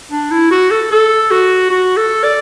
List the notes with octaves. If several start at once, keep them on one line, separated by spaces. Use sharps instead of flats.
D4
E4
F#4
A4
A4
F#4
F#4
A4
D5